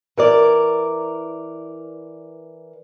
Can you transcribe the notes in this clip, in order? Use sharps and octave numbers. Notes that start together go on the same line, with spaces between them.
E3 A#4 D5